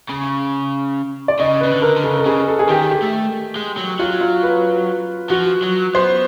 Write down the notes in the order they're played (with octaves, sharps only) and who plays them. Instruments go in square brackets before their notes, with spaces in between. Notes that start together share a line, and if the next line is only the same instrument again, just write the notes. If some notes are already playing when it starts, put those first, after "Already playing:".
[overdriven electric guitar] C#3
[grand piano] D5
[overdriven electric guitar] C#3 [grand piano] D#5
[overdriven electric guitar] C#3 [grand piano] B4
[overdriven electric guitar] D3
[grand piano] A#4
[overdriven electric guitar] D3
[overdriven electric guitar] C#3 [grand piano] A4
[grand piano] A4
[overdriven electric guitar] C#3 [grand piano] G#4
[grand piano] A4
G#4
[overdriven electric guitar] D#3 [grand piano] G4
[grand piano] G4
[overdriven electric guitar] A3
G#3
F#3
[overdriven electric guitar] F#3 [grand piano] F4
[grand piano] F4
B4
[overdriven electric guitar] F3 [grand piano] F#4
[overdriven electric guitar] F#3
[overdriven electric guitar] B3 [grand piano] C5